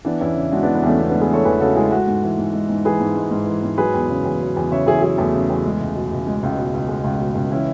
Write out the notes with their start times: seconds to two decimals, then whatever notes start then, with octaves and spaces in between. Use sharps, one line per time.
0.05 E3 B3 D4
0.21 E2 C#4 E4
0.36 C#3
0.51 G#3 D4 F#4
0.63 B3 D4
0.67 E3
0.75 B3
0.83 E2 A3 C#4
0.98 C#3 B3
1.10 B3 D4
1.14 G#3
1.21 G#4 B4
1.30 E3 A4 C#5
1.45 E2 G#4 B4
1.60 C#3 F#4 A4
1.76 G#3 E4 G#4
1.91 G#3 F#4 A4
2.07 G#2
2.23 E3
2.38 G#2
2.53 G#3
2.69 G#2
2.85 E3 G#4 B4
3.00 G#2
3.16 G#3
3.31 G#2
3.47 E3
3.63 G#2
3.78 F#3 G#4 B4
3.94 E2
4.10 C#3
4.25 E2
4.41 F#3
4.57 E2
4.71 C#3 C#5 E5
4.86 E2 E4 G#4
5.02 F#3 E4 G#4
5.18 E2 A3
5.34 C#3
5.50 E2
5.65 G#3
5.81 C#2
5.95 B2
6.12 C#2
6.27 G#3
6.43 C#2
6.58 B2
6.74 C#2
6.89 G#3
7.04 C#2
7.20 B2
7.35 C#2
7.52 E3 C#4 E4